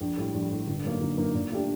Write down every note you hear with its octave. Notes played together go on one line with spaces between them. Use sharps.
A#1
A2 G3
A#1
A2 G3
G1
F#2 F#3 A#3 D#4
G1
F#2 F#3 A#3 D#4
A#2
A3 D4 G4